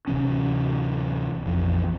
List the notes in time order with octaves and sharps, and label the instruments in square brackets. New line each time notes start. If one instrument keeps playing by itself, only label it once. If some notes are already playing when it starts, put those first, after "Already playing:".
[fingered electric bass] D1 C3 E3 C#4
A#1 F2 E3